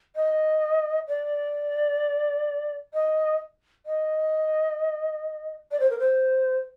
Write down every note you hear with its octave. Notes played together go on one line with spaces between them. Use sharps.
D#5
D5
D#5
D#5
D5
C5
A#4
C5